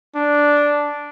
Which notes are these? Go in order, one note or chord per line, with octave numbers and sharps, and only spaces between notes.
D4